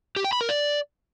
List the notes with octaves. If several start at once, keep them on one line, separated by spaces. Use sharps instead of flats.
G4
G5
B5
A#4
D5